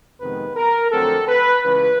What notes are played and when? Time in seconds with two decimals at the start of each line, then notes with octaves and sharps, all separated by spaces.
0.20 F2 C3 D#3 G#3 B3 B4
0.56 A#4
0.92 F2 D3 F#3 A3 C4 A4
1.28 B4
1.63 C#2 C#3 E3 B4